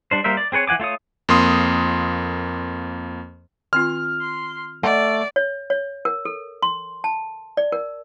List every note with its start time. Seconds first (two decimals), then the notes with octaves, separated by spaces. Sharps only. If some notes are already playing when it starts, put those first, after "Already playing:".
0.11 G3 D4 C5
0.24 G3 A#3 A#4 C5 E5
0.37 D5
0.52 C4 G#4 B4 C#5
0.68 E3 F3 F#5 G#5 D6
0.80 A3 F4 C#5 D#6
1.29 F2 A#3 C6 D#6
3.73 D#3 C4 F4 F6
4.21 C6
4.83 A3 D5 D#5 F#5
5.36 C#5
5.70 C#5
6.05 A#4
6.25 A4
6.63 C6
7.04 A5
7.57 D5
7.72 A#4